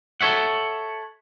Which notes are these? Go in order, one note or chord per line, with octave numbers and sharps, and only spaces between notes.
A4 C#5 E5 F#5